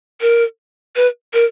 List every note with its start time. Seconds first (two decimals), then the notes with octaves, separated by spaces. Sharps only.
0.21 A#4
0.96 B4
1.33 A#4